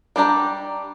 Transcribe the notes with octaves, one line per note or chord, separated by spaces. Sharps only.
G3 D4 G4 A#5